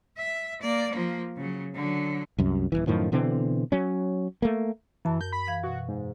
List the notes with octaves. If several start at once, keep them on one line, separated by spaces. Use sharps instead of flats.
E5
A#3 D5
F3 A#3
C#3 F#3
D3 F#3
C2 F#2
D#1 C#2 E3
F#2 A2 D#3 F3
B2 D3 E3 C4
F#3 C#4
A3 A#3
F#2 E3 A5
A#4 G6
B5
E3 F5 G#6
B2 F#4
G#2